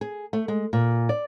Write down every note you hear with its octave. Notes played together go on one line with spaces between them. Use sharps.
G#4
A3
G#3
A#2
D5